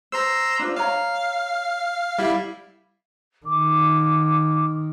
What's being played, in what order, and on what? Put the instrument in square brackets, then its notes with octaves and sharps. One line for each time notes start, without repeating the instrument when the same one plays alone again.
[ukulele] C5 [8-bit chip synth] A#5 C6 E6
[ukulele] D4 F4 C5
[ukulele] C#5 A#5 [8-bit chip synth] F5
[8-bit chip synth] G3 E4 [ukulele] F5
[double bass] D#3 [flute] D6